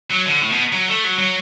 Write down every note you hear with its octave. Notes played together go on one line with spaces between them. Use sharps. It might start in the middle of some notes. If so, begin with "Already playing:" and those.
F#3
D3
A2
B2
F#3
A3
F#3
F#3